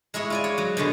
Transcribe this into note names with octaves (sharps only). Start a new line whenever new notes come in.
G#3 E4 G#4 C#5
F4 D5 G#5
C#5
F#3
B2 D3 G#3